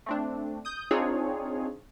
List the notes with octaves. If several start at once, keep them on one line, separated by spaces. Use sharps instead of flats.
A3 C4 D4
D#6 G6
C4 D4 D#4 F4 G#4 C#5